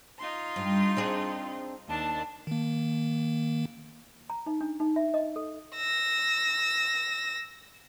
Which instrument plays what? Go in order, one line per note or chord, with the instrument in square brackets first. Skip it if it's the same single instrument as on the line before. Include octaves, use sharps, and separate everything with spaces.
[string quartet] D#4 F4 C6
[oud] G2
C4 D4 G#4
[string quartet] D#2 D4 A5
[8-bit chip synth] D#3 A#3
[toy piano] A#5
D#4
D4
D#4
E5
D#5
A4
[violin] E6 A#6